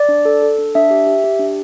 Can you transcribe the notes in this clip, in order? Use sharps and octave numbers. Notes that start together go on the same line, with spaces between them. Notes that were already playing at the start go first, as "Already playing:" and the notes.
Already playing: D5
D4
A4
A4
D4
D4 E5
G4
G4
G4
D4